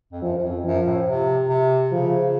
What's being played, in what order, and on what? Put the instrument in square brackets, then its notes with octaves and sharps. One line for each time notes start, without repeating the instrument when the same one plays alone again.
[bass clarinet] F2
[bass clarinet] F#2 [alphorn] F3
[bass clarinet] F#2
F2
[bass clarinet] F#2 [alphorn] F3
[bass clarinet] A2
C3
C3
[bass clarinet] C#3 [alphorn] F3